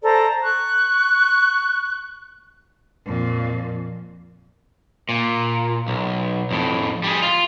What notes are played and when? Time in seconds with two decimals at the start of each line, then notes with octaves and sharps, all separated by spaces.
0.03 A4 C5 D5 A#5
0.42 C#6 F#6
3.06 F2 A#2
5.09 A#2
5.88 B1
6.51 F2 A2
7.04 G3 G#4
7.22 F4